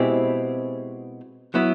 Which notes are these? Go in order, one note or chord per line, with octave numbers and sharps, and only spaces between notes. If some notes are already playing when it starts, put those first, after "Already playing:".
Already playing: B2 G#3 C4 E4 G4
F#3 B3 E4